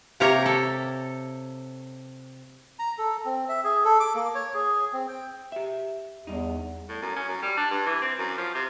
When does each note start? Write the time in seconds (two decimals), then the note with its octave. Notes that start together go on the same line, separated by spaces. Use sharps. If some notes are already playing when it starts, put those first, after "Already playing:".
0.20 C3 A#3 G4 A#4 C#5 A#5
0.46 A4
2.79 A#5
2.98 A4
3.25 C4
3.49 E5
3.64 G#4
3.85 A4
4.00 D6
4.15 A#3
4.35 C#5
4.54 G#4
4.93 C4
5.08 G5
5.52 G4 E5
6.27 E2 G2 D#4
6.89 A2
7.02 F#2
7.16 C#4
7.28 F#2
7.42 G3
7.57 D4
7.71 G2
7.86 E3
8.02 C4
8.18 F#2
8.38 F3
8.55 C3